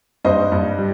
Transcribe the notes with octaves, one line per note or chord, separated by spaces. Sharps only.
G2 C5 D#5
G2
G3